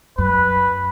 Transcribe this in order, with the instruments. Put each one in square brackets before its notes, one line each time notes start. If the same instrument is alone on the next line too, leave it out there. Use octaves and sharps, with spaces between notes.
[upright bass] F#2 [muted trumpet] B4